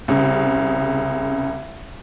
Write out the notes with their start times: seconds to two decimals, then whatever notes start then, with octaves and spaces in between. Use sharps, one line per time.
0.08 C2 C#3